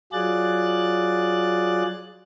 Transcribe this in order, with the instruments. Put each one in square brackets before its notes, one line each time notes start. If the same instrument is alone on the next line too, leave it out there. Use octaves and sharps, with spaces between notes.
[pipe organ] F#3 F4 G#4 D5 F#6 A6